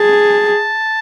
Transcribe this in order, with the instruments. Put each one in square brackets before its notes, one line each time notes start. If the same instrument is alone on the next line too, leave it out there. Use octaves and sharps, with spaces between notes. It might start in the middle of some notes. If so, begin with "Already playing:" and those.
Already playing: [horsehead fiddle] G#4 [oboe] A5